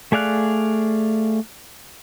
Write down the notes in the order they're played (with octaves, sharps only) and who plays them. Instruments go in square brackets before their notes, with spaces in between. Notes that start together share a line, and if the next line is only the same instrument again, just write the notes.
[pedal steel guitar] A3 G#4 D5 F5 F#6